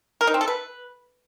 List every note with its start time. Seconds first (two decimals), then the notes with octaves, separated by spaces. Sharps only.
0.21 A#4
0.27 D#4
0.34 C4
0.41 A4
0.48 B4